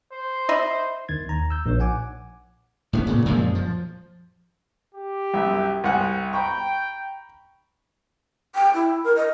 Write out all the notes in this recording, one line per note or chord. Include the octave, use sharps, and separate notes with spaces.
C5
D#5 E5 B5
E2 D#3 G#6 A6
D#2 A#5
E6 G6
A#1 D#4 C#5
F#5 G#5 D6
A2 A#3 B3
A#2 C#3
F#2 A#2 F3 G#3
F3
G4
C2 F#2 E5
C2 F#5 G#5
G5 A#5 B5 C#6
G5
E4
A#4
D#5